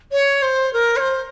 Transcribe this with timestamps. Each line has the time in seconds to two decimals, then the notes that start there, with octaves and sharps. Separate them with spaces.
0.12 C#5
0.42 C5
0.73 A#4
0.96 C#5
1.00 C5